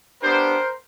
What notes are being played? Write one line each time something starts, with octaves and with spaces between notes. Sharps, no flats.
B3 D4 G4 A#4 C5